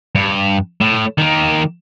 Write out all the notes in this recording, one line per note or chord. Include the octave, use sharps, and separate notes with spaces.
G2
A2
D#3 A#3